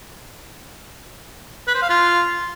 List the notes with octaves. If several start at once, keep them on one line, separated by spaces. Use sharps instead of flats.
B4
C5
F5
F4